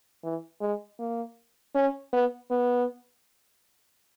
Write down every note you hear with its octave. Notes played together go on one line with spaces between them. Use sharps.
E3
G#3
A#3
C#4
B3
B3